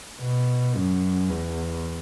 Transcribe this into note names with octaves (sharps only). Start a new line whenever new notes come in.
B2
F#2
E2